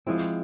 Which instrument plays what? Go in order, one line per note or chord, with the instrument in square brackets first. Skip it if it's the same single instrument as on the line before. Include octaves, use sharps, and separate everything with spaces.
[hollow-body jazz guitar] F3 G#3 C4 [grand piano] E4